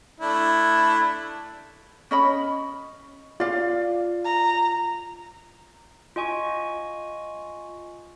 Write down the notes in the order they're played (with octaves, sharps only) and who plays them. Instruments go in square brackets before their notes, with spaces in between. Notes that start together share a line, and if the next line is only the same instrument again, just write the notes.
[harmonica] A3 D4 E4
[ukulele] C#4 D#5 B5
[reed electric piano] F4 [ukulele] D5 F5
[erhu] A#5
[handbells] F4 D#5 G#5 C#6